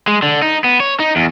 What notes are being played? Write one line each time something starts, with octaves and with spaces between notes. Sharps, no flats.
G#3
D3
D#4
B3
C#5
D#4
E2